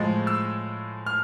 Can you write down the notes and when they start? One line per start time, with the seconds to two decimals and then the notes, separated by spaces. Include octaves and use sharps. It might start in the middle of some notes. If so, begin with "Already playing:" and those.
Already playing: A2 F3 G#3
0.27 E6
1.06 F6